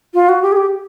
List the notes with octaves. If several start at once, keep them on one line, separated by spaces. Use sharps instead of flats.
F4
F#4
G4
G#4
G4